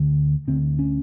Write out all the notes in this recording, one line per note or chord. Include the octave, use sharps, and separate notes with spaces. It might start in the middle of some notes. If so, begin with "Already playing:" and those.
Already playing: D2 D3
D2 D3 C4
C#4